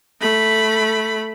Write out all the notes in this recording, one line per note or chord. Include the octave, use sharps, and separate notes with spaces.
A3 B5